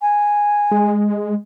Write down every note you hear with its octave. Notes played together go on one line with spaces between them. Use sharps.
G#5
G#3